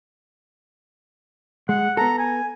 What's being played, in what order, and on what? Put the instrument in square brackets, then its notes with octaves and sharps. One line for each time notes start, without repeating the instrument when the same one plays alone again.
[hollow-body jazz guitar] G#3 [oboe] F#5
[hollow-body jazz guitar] B3 A4 [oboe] A#5
[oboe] G#5